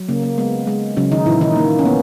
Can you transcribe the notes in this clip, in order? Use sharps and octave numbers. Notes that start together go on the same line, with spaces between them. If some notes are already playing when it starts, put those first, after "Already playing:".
Already playing: F#3
C#3 A#3
A#3
G#3 B3
G#3
C#3 F#3 C#4
D#3 D#4
A#2 E3 E4
D#3 D#4
A#3
C#4
A#3 B3